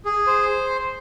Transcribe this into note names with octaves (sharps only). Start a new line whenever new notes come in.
G#4
C5